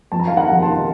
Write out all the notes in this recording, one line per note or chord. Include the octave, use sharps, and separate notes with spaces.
F2 A5
A#5
D#3 F5 A5
F#5 A#5
F2
A5 C6
D#3